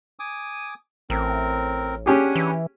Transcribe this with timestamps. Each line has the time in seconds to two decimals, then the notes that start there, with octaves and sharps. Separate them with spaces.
0.19 G#5 D6 D#6
1.10 A1 C4 A#4
2.06 C#4 D4 G4 G#4 F#5 G#5
2.35 E3